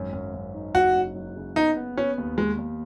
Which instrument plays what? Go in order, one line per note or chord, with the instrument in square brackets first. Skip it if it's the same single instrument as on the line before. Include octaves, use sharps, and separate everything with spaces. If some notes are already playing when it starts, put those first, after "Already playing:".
Already playing: [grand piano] G#1 F#2
F#2
F#2
D#4
[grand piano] F#1 [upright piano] F#4
[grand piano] F#2
F#3
C#3
[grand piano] B3 [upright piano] D#4
[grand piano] B3
[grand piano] B3 [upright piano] C#4
[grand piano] D#2
[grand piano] D#2 [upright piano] G#3
[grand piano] D#2